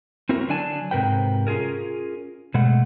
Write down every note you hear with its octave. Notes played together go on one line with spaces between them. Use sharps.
C4 E4 F#4 A#4
D3 F#3 D4 D5 G#5 A5
G#2 C3 A#4 B4 G5
C#4 F4 F#4 G#4 A#4
B2 G#3 A3 F#5